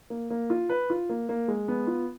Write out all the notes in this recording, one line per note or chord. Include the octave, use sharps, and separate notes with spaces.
A#3
A#3
F4
B4
F4
A#3
A#3
G#3
B3
F4